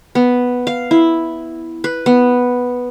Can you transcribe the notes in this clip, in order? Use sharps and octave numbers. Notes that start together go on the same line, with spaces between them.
B3
F5
E4
B4
B3